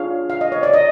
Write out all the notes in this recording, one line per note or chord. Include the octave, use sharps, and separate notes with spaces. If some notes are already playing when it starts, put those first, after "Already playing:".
Already playing: D4 F4 G#4 C#5 F5
F5
D#5
C#5
D5
D#5